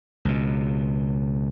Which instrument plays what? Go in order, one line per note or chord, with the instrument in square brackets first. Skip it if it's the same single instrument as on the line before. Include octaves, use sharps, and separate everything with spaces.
[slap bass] C#2 B2